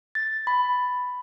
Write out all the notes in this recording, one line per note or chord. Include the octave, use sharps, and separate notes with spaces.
A6
B5